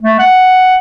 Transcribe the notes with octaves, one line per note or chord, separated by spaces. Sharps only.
A3
F#5